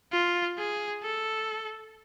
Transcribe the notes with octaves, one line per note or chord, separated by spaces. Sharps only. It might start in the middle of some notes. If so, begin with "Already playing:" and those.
F4
G#4
A4